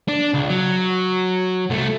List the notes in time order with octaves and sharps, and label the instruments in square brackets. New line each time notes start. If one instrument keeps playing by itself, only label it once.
[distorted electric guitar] D4
C#2
F#3
C2 A3